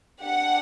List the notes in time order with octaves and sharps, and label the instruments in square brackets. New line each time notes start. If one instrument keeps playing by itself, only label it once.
[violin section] D4 G4 F#5